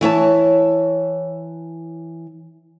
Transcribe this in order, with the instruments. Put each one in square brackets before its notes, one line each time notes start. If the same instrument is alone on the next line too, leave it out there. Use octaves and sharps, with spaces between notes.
[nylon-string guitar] E3 C#5 E5 A5